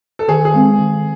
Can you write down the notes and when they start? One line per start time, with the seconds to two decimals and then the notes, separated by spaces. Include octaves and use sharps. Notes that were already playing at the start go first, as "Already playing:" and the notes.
0.19 A4
0.28 D#3 G#4
0.45 G#4
0.54 G#3 C4
0.79 D#3